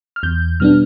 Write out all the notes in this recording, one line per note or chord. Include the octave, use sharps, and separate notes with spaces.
F6
E2 G6
B2 G3 B3 D4 F6